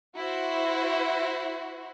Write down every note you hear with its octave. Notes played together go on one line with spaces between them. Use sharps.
E4 F#4 C5